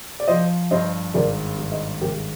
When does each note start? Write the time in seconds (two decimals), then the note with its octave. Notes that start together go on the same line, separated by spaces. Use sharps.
0.20 D5
0.28 F3 C5 D#5
0.71 G2 C5 D#5
1.14 G#1 A#4 D5
1.58 G2
1.72 C5 D#5
2.01 G#1 G4 A#4